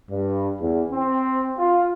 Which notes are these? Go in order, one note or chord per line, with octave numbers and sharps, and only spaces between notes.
G2
E2
C4
F4